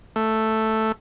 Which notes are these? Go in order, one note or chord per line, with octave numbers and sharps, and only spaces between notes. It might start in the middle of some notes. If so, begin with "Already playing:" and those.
A3